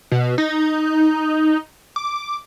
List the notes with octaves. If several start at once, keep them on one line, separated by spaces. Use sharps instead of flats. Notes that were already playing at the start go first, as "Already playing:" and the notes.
B2
D#4
D6